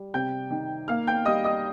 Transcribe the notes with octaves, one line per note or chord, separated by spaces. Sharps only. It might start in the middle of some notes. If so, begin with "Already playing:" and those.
Already playing: G3
C3 G5 G6
D#3
A#3 F5 F6
G5 G6
G3 D#5 D#6
D#5 D#6